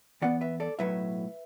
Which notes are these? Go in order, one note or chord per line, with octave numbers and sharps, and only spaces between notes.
E2 E3 B3 D5 F#5
B4 E5
A4 D5
B1 A2 F#3 B4 E5